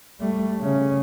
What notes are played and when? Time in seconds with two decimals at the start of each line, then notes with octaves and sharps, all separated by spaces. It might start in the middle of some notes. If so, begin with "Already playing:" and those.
0.20 G3 A3
0.60 C#3 C#4